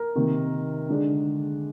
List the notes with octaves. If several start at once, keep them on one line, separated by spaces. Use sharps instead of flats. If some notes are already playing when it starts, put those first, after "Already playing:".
Already playing: A#4
C3 D#3 A#3
D3 G#3 D4